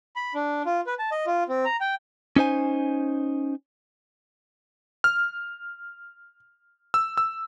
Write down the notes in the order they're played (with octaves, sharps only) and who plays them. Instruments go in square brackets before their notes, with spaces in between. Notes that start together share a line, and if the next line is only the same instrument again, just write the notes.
[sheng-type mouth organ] B5
D4
F4
B4
A5
D#5
F4
C4
A#5
G5
[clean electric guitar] C#4 D#4 C5 G#5
[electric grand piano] F6
E6
E6